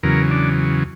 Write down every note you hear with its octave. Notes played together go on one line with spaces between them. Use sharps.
E2 C#3 F#3 A#4
D4